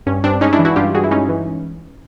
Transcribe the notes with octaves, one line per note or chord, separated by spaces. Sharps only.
G2 C#4
G2 C4 D4
G#3 C#4 D#4
D4 E4
E3
E4 F#4
G2 F4 G4
G2 F#4 G#4
E4
G#3 C#4 D#4
E3